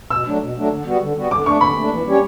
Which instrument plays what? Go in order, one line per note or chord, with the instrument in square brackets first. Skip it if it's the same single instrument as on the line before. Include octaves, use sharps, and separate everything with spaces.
[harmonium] B2 [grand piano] E6
[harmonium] F#3 A3 D4
B2
F#3 A3 D4
D3
G3 B3 F#4
D3
G3 B3 F#4
[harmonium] D3 [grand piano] D6
[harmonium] A3 D4 [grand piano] C#6
[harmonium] D3 [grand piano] B5
[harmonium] A3 D4
E3
G3 C#4 G4 C#5